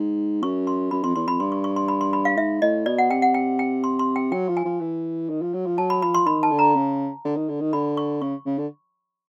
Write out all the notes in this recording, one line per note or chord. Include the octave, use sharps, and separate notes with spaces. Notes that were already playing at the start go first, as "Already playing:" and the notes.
Already playing: G#2
F#2 C#6
C6
F#2 B5
F2 C6
E2 C6
F2 B5
G2 C6
C#6
C#6
C6
B5
C6
B5
F5
G#2 E5
A2 D#5
B2 D5
F#5
C3 G5
F#5
G5
G5
C6
C6
G5
F#3 G5
F3
G#5
F3
E3
D#3
F3
F#3
F3
F#3 A5
B5
F3 B5
C6
D#3 B5
A5
D3
A#5
C#3
D3
D#3
D3
D#3
D3 B5
C#6
C#3 C#6
C#3
D3